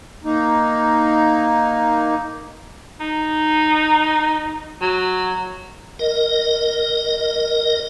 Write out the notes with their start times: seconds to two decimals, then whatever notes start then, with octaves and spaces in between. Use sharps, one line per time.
0.24 A#3 D#4
3.00 D#4
4.81 F#3
5.99 A#4 D#5